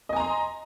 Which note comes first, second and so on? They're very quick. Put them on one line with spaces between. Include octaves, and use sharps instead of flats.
D#5 G#5 A#5 C6